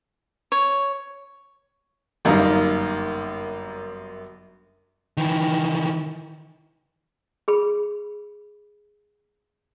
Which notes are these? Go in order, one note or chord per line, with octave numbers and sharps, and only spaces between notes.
C#5
G1 F#2 G3 A#3 D#4
D#3 E3
G#4 B5